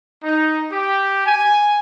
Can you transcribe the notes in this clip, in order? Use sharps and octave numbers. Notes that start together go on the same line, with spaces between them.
D#4
G4
G#5